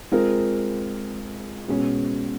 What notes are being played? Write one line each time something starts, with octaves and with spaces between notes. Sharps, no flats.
G#3 C4 F4 A#4
B2 G#3 C#4